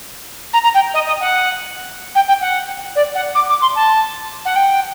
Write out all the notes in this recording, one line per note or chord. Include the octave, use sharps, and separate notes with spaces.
A#5
A#5
G5
D#5
D#5
F#5
G5
G5
F#5
D5
F#5
D6
D6
C6
A5
F#5
G5